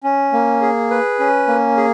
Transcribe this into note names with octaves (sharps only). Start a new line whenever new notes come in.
C#4
A#3
G#4
B4
C#4
A#3
G#4